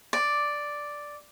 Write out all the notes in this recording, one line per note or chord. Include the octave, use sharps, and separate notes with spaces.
D5